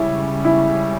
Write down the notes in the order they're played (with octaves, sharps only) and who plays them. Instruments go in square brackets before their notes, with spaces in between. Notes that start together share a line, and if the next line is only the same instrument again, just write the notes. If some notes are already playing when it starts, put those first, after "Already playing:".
Already playing: [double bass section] C#2 C#3 G3 C#4 [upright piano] E4
[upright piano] E4